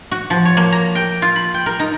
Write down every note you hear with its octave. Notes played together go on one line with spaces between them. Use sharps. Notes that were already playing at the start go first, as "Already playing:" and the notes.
F#4
F3
C#5
A#3
A#5
G5
F4
B5
G5
A#4
D#4